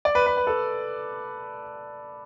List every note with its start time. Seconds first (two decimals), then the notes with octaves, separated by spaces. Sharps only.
0.05 D5
0.15 B4
0.26 B4
0.37 B4
0.47 A4